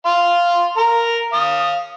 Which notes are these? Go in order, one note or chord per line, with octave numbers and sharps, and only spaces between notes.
F5 C6
A#4 A#5
F5 D#6